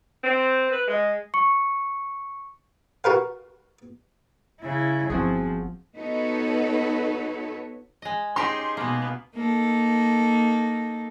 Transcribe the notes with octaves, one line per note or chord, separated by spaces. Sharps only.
C4
B4
G#3
C#6 C#7
F#4 A#4 B4 F5
C#3 E4
G1 F3 C4 F#4 G#4
B3 D#4 F#4 A4 B4 C#5
G#3 D#5
C#4 D#4 G4 G#4 C6
B2 G#3 A#3 B3
A#3 D#4 A4